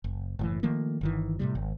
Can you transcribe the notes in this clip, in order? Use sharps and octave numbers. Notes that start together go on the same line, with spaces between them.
F#1
F#1 A2 E3
D#3 F3 A3 A#3
G1 D#3 E3
A2 C3 F3 G3
G#1